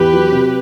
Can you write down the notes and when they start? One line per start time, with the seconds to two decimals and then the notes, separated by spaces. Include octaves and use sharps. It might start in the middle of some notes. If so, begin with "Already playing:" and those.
Already playing: E2 G4 B4
0.13 F#3
0.32 C3